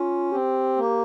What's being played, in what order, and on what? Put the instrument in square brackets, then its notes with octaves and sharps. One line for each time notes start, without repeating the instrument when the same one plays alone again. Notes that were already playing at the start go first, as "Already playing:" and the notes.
Already playing: [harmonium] C#4 [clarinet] F4
[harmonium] C4 [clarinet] G4
[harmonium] A#3